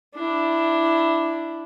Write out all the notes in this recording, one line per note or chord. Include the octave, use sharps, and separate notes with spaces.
D4 E4